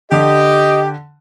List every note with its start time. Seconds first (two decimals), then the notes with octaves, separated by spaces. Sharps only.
0.12 D3 G4 D#5